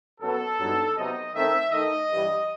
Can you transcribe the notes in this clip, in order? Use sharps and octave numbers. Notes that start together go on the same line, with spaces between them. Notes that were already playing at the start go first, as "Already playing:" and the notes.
F#2 F#3 B3 A4
G2 F#3 B3 D#4
C3 F#3 B3 D#4 D#5
D#3 A3 C4 E5
D#3 A3 D#4 D#5
G2 E3 G3